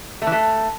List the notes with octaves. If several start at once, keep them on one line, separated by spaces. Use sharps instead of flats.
A3
E3
A3